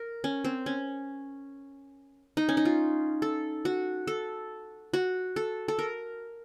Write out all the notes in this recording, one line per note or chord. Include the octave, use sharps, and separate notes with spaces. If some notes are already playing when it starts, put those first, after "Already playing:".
Already playing: A#4
C#4
C4
C#4
D#4
C#4
D#4
F4
A4
F#4
A4
F#4
A4
A4
A#4